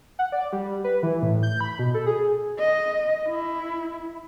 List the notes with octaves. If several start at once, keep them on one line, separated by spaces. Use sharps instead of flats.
F#5
D5
G3
B4
E3
A2
G6
B5
B2
A4
G#4
D#5
E4